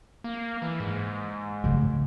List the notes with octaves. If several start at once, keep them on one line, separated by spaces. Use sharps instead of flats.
A#3
E3
G#2
C#3 A3